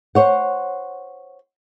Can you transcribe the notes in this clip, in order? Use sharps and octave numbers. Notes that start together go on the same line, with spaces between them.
C5 C#5 F#5